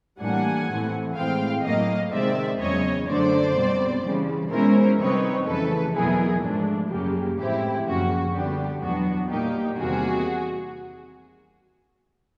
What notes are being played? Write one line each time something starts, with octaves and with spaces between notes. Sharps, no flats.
A2 E3 G3 A#3 D4 F#5 G#5
A2 E3 A3 C4
A2 E3 G#3 C4 F5 G5
A2 F#3 A#3 D#5 F5
C3 D#3 G#3 C4 D5 E5
E2 C#3 F#3 C#5 D#5
F#2 D3 F#3 A3 D4 C5 D5
B2 G3 C4
C#3 E3 G3
B2 G#3 C#4 E4 A#4 C5
C3 D#3 G3 C4 D#4 B4 C#5
F2 C#3 E3 A3 A4 B4
E2 B2 F#3 B3 E4 G#4 A#4
G#2 F3 A3 D4
F#2 C#3 F#3 A#3 G4
A2 E3 G#3 C4 E4 G4
F#2 C#3 F3 A#3 F#4
D3 G3 B3 D4 G4
E2 B2 F#3 B3 D4 F#4
A#2 G3 A#3 D#4 G4
E2 C3 D#3 G3 A#3 F#4 G#4